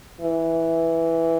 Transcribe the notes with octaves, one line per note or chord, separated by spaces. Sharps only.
E3